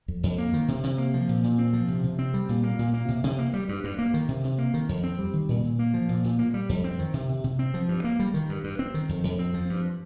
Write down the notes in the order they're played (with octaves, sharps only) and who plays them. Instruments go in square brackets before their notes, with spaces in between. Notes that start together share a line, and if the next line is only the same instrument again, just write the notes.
[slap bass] F2
F2
A#3
D#3
C3
C3
A#3
F3
A#2
A#2
C4
F3
C3
C3
C4
G3
A#2
A#3
A#2
A#3
C3
C3
A#3
G3
G2
G2
A#3
D#3
C3
C3
A#3
D#3
F2
C4
G3
D#3
A#2
A#2
A#3
F3
A#2
A#2
A#3
G3
F2
C4
D#3
C3
C3
C3
C4
F3
G2
A#3
G3
D#3
G2
G2
C4
D#3
F2
F2
C4
F3
G2